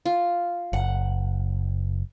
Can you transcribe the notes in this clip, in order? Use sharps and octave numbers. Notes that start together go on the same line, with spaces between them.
F4
F#1 F#5